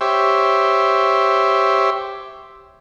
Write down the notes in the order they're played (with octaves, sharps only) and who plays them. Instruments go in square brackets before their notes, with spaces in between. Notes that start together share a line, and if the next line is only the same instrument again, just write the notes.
[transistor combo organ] G4 C5 C#5 E5